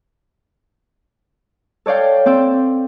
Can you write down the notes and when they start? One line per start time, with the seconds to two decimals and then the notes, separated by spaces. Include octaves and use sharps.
1.86 A4 C#5 D5 F5 G5
2.26 C4 D5 G5 E6